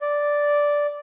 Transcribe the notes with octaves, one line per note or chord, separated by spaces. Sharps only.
D5